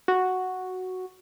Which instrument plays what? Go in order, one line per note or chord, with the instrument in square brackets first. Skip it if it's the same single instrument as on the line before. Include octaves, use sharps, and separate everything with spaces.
[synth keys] F#4